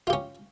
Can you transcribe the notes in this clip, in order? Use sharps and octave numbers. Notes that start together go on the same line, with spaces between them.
C#4 F4 G4